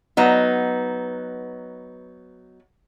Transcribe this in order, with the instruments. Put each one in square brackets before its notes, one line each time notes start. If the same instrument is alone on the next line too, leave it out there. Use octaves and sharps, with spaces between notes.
[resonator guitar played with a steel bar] F#3 B3 D#4